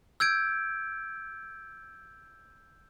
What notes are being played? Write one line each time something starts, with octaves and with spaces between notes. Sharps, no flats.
E6 G6 G#6 D7